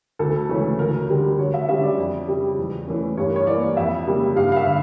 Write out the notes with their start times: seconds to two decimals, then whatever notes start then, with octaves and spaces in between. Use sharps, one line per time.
0.19 D2 A4
0.49 C#3 E3 A3 C#4
0.79 D2 A#4
1.08 D3 G3 A#4
1.39 D2 C#5
1.54 E5
1.69 D3 G3 C#4 E5
1.83 D5
1.98 F2
2.28 C#3 G3
2.58 E2
2.87 E3 A3 C#4
3.17 G2 C#5
3.26 A#4
3.36 C#5
3.47 E3 A#3 D5
3.77 F2 E5
4.07 C#3 G3 A#3
4.36 G2 F5
4.52 F5
4.56 E5
4.67 D3